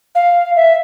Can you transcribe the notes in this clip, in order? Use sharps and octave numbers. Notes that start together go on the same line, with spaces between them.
F5
E5